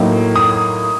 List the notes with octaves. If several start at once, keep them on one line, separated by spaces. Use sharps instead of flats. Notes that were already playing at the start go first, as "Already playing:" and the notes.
Already playing: A2 F#3 A#3 D#4
D#6